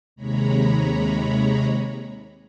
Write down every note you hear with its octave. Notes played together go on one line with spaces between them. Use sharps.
D#2 C3 G#3 C#5 A#5 B5